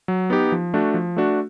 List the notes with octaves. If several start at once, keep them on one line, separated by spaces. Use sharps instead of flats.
F#3
B3 D#4 G4
F3
A3 D4 F#4
F3
A3 D4 F#4